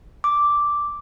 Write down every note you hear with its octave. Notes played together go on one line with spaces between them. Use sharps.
D6